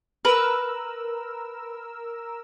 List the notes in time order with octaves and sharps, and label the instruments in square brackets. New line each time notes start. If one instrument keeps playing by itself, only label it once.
[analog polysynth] A#4 E6 [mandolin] B4